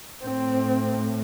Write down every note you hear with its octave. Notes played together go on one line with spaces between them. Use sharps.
A2 C4